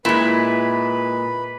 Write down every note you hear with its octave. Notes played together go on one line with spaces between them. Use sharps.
A#2 G#3 E4 B4